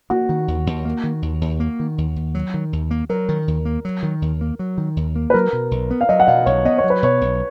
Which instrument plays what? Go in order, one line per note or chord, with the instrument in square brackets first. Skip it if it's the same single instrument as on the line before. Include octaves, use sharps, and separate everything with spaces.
[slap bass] A#3 [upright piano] F#4
[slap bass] D#3
D#2
D#2
A#3
D#3
D#2
D#2
A#3
D#3
D#2
D#2
F#3
D#3
D#2
A#3
[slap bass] F#3 [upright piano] A#4
[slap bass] D#3
D#2
A#3
F#3
D#3
D#2
A#3
F#3
D#3
D#2
A#3
[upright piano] B4
[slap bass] F#3 [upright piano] A#4
[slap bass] B2
B1
B3
[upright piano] F5
[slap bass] F#3 [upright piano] D#5
[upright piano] F#5
[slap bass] B2 [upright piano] F5
[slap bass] B1 [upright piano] C#5
[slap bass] B3 [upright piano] D#5
[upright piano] C#5
[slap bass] F#3
[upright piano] B4
[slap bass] B2 [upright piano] C#5
[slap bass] B1